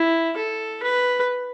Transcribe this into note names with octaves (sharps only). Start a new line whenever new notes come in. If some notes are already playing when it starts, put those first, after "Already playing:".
Already playing: E4
A4
B4